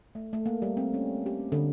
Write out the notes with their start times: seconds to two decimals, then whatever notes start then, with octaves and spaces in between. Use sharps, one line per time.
0.15 A3
0.33 A3
0.46 A#3
0.62 G3
0.77 C4
0.94 C#4
1.26 G4
1.52 D3